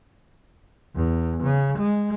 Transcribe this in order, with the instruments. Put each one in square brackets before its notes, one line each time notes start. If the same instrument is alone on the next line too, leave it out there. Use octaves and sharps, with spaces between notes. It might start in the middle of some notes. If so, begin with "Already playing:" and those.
[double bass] E2
C#3
G#3